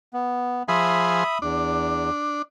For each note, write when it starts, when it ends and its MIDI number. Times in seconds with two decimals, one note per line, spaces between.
0.13 0.63 59
0.68 1.24 53
0.68 1.24 68
0.68 1.24 72
0.68 1.38 76
0.68 1.38 83
0.68 1.38 87
1.42 2.10 40
1.42 2.42 62